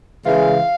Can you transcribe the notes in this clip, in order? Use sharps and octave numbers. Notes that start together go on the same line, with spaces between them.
C#3 E3 G#3 F5